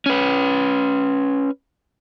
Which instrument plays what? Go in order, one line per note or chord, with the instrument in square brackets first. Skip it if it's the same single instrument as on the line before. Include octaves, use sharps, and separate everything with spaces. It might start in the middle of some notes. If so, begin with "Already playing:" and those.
[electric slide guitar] C#4 B4